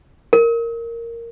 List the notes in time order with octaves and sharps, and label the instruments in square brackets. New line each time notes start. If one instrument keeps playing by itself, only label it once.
[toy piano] A#4